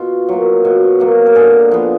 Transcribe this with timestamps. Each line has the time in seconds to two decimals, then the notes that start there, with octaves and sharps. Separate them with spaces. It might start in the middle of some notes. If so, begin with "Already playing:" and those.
Already playing: B2 F4
0.29 F#3 A#3
0.65 B2
1.00 F#3 A#3
1.26 A#4
1.35 D3 G#4
1.71 F3 B3